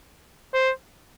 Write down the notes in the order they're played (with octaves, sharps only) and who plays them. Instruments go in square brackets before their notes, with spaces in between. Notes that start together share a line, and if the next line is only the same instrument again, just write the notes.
[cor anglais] C5